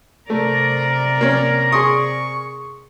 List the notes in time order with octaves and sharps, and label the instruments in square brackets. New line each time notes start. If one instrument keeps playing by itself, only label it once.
[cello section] C3 A#4 D5 [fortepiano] A3
[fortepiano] A#3 C#4
[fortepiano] G#4 C6 D#6 [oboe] C#6